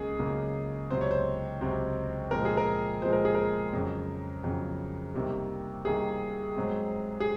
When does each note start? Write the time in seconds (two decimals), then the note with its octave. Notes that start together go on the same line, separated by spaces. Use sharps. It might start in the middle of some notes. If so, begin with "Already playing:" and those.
Already playing: C#2 C#3 F#3 A#3 G#4
0.19 C#2 C#3 F#3 A#3
0.90 C#2 C3 F#3 C4 C5
1.01 C#5
1.11 C5
1.61 C#2 C3 F#3 C4
2.31 A#2 F3 G#3 C4 A#4
2.45 G#4
2.57 A#4
3.02 A#2 F3 G#3 C4 C5
3.13 A#4
3.25 G#4
3.35 A#4
3.73 F2 C#3 F#3
4.43 F2 C#3 F#3
5.14 C2 C3 D#3 A#3
5.85 C2 C3 D#3 A#3 G#4
6.57 G#2 F#3 C4
7.20 G#4